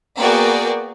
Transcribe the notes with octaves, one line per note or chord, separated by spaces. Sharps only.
A#3 B3 F#4 G#4 D5 G5